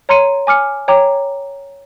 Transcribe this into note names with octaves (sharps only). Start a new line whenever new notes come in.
C#5 A#5 C6 C#7 D#7
G#5 D6 F6 C#7
C#5 G5 A#5 D6